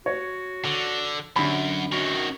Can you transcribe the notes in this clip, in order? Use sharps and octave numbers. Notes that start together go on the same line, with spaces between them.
F#4 C#5
D3
F#2 D3 B5
F#2 D#3 F#4